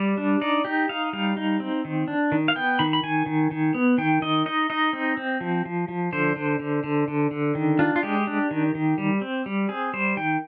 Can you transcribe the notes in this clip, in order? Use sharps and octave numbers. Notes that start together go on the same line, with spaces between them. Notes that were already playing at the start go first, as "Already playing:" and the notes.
Already playing: G3 D5
D4
D#4 D5
D#4 G4
D#4 F5
G3 F5
D#4
C4
D#3
D4
D#3
F5
B3 G5
D#3 B5
B5
D#3 G#5
D#3
D#3
B3
D#3 G5
D#3 D#5
D#4 D#5
D#4 D#5
C4
C4
F3
F3
F3
D3 C5
D3
D3
D3
D3
D3
D#3
D4 F4
F4
G#3 G4
D4
D#3
D#3
G3
C4
G3
C4 G#4
G3 C5
D#3 G5